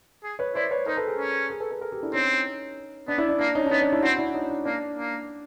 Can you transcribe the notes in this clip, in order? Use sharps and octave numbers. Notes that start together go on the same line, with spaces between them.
G#4
B4 C#5
E4 C5 D5
B4 C#5
D#4 A#4 C5
A4 B4
G#4 A#4
C#4
G#4 A#4
A4 B4
A4 B4
G#4 A#4
G4 A4
D4 E4
C4 C#4 D#4
B3 D4
D4 E4
D4
A#3 D4
C#4 D#4
D4
B3 C#4 D#4
D4
D4 E4
C4 E4 F#4
D4 E4
C#4 D#4
D4
A#3 D4
A#3